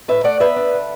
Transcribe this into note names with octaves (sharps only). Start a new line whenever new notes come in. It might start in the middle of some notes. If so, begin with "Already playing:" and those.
A2 B4 E5
A3 D5 F#5
B3 B4 E5
D4
D3